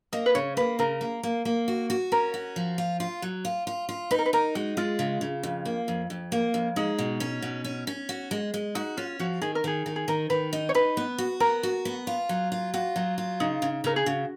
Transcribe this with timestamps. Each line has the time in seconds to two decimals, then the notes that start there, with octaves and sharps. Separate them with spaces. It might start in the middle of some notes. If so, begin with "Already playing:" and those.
0.13 A#3 D#5
0.26 B4
0.35 C#3 C#5
0.57 A#3 B4
0.79 C#3 A#4
1.01 A#3
1.23 A#3
1.45 A#3
1.68 F#4
1.90 F#4
2.12 C#4 A#4
2.34 F#4
2.56 F3
2.78 F4
3.00 F4
3.22 F#3
3.45 F4
3.67 F4
3.89 F4
4.11 D#4 B4
4.19 A#4
4.26 B4
4.33 D#4 A#4
4.55 G#3 F#4
4.77 G#3 F4
4.99 C#3
5.21 C#3
5.43 F2
5.65 A#3
5.88 F2
6.10 F2
6.32 A#3
6.54 F2
6.76 G#3 D#4
6.99 B2
7.20 C#4
7.42 B2
7.64 C#4
7.87 C#4
8.09 F#4
8.31 G#3
8.54 G#3
8.75 D#4 F#4
8.97 C#4 F4
9.19 F3 F#4
9.42 D#3 G#4
9.55 A#4
9.64 D#3 G#4
9.86 D#3
9.96 G#4
10.08 D#3 A#4
10.30 D#3 B4
10.53 D#4
10.69 C#5
10.75 D#4 B4
10.97 B3
11.18 F#4
11.40 B3 A#4
11.63 F#4
11.85 B3
12.07 F4
12.29 F#3
12.52 F4
12.74 F4 F#4
12.96 F#3
13.18 F4
13.40 C#3 D#4
13.62 C#3
13.84 C#3 A#4
13.96 G#4
14.06 C#3 F#4